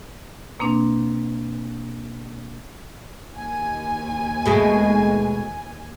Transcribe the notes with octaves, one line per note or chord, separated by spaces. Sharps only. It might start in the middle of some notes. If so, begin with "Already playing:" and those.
B2 A#3 C4 D4
D#2 G#5
B2 G#3 A3